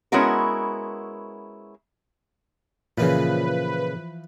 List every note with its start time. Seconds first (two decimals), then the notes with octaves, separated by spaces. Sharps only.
0.12 G#3 B3 C#4 E4 F#4 A#4
2.98 A#2 C#3 E3 F3 B4